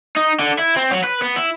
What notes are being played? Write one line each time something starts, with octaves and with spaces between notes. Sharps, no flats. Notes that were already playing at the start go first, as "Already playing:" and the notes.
D#4
D3
E4
C4
F#3
B4
B3
E4